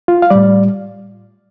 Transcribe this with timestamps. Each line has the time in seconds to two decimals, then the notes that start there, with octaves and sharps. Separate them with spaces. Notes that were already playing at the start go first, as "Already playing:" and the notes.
0.08 F4
0.22 F5
0.30 A2 G3 D5